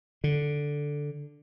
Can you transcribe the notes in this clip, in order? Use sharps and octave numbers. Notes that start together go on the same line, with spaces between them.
D3